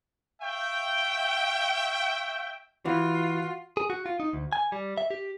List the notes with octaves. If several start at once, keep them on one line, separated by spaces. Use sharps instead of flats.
C#5 E5 F5 G5
E3 F4 F#4
G#4
F#4
F4
D#4
D2
G#5
G3
E5
G4